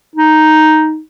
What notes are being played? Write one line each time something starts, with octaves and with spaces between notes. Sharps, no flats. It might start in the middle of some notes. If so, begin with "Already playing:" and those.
D#4